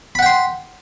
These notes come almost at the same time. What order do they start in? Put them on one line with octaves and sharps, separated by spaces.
B5 F#5 G5 C6